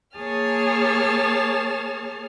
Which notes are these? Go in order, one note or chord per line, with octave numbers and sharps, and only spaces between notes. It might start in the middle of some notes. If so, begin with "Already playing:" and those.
A#3 G#4 C#5 A5 F6